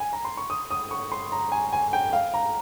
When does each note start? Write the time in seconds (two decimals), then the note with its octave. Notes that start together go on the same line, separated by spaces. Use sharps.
0.00 G#5
0.13 A#5
0.25 C6
0.37 C#6
0.50 D#6
0.71 D#6
0.91 C#6
1.12 C6
1.32 A#5
1.52 G#5
1.73 G#5
1.93 G5
2.13 F5
2.34 A#5